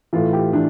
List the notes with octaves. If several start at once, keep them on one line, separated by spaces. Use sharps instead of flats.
A2 E3 F4
G4
E3 D4